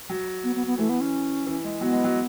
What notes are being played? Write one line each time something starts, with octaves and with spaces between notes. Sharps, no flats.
F#3
B3
B3
B3
E3 A3
B3
C#4
E3
G#3
F#3 B3
G#3
F#3